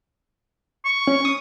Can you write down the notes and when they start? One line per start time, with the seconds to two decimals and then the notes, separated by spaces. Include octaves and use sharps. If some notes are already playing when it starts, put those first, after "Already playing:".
0.85 C#6
1.07 C#4
1.25 D#6